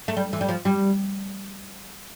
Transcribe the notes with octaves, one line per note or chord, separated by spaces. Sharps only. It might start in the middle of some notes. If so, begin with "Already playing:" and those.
A3
G3
E3
G3
F3
G3